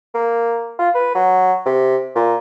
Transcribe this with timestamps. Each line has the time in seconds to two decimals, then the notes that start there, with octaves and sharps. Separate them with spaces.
0.14 A#3
0.79 F4
0.95 B4
1.15 F#3
1.66 C3
2.15 A#2